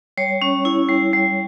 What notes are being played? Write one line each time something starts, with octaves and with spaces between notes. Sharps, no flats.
G3 C#5
C#4
E4
G3
G3